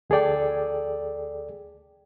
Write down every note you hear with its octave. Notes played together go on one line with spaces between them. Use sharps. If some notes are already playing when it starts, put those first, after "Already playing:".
D2 G#4 A4 D5 G5